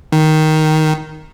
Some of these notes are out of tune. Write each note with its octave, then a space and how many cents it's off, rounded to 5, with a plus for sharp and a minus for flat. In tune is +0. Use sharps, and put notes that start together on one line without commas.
D#3 +5